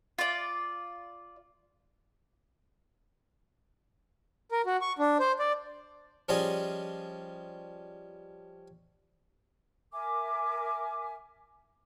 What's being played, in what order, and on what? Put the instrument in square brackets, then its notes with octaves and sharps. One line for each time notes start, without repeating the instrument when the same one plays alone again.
[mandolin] F4 D5
[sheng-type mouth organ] A#4
F#4
C#6
D4
C5
D5
[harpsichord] F3 G3 C#4 F4 G#4 D#5
[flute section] A#4 E5 G#5 D6